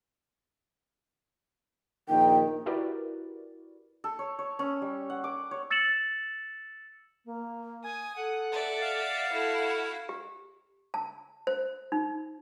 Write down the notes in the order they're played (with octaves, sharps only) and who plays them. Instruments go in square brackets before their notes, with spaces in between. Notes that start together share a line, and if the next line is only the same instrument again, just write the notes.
[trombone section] A#1 D#3 [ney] G5
[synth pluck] E4 F#4 G4 A#4 B4 D5
[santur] A4
C#5
C#5
C#4
G3
F#5
D6
C#5
[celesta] E6 A6 C#7 E7 F#7
[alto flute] A#3
[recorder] G#5 [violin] D#6
[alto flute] A4 [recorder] F#5
[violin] D5 E5
[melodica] F5
[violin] E4 F#4 [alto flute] A4
[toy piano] G4
A5
C5
D#4